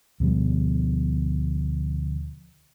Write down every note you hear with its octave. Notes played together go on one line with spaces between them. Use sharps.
D2 B2 F3 G3